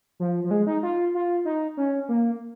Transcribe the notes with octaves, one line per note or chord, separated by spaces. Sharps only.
F3
F3
G#3
D#4
F4
F4
D#4
C#4
A#3